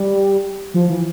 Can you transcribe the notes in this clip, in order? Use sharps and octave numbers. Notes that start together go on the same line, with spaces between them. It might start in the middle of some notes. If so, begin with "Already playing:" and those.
Already playing: G3
F3
E3